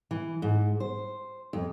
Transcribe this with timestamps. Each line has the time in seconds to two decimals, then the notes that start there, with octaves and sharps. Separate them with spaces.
0.11 E3
0.42 G#2
0.80 C5
1.53 F2